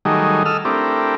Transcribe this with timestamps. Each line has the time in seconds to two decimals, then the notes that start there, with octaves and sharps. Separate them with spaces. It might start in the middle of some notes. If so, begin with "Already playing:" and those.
0.05 D#3 F#3 G3 A3 D#4 G#4
0.46 A4 D#5 E6 F6
0.65 A3 C4 D4 E4 G4 A#4